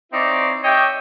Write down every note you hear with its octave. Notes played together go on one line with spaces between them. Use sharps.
C4 D#4 E4 C#5 D5
G4 C#5 D#5 E5 G5